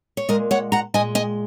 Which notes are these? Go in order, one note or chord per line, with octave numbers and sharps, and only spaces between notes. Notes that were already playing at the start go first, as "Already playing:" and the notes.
C#5
A#2 G#3 A#4 D#5
C#5 F#5
F#5 A#5
A#2 G#3 D#5 G#5
D#5 G#5